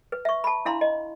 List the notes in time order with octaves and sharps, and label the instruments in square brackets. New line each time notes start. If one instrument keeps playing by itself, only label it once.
[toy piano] B4
E5 C#6
A5 B5
D4 E4 F5 A#5 C6
D#5